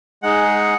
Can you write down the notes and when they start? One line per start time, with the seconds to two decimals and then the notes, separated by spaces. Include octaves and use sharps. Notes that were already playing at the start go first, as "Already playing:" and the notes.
0.23 G#3 D#4 G#4 F#5